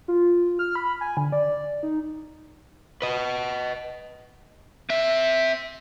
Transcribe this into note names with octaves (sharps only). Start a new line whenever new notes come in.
F4
F6
B5
G#5
D3
D5
D#4
B4 D#5
C4 E5